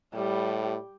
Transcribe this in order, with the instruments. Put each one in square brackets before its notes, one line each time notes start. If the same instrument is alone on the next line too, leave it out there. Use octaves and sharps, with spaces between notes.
[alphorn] A2 [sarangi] G3